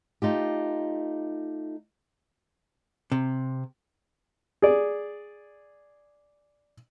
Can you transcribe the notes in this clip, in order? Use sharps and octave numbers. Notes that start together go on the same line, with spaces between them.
A3 D#4 F4 G4
C3
G#4 D5